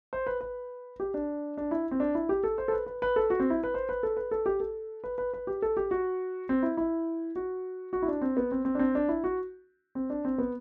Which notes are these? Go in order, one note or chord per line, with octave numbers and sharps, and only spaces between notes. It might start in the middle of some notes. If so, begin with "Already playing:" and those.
C5
B4
B4
G4
D4
D4
E4
C4
D4
E4
G4
A4
C5
A4
B4
B4
B4
A4
F#4
C4
E4
B4
C5
B4
A4
B4
A4
G4
A4
B4
B4
B4
G4
A4
G4
F#4
C4
E4
E4
F#4
F#4
E4
D4
C4
B3
C4
C4
D4
C4
D4
E4
F#4
C4
D4
C4
B3